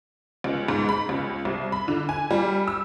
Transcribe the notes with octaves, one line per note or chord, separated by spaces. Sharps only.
C#2
G#2
B5
C#2
C2
B5
D3
G#5
G3
E6